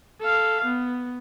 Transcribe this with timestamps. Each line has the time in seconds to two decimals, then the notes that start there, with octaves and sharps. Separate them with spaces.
0.21 A4 F5
0.65 B3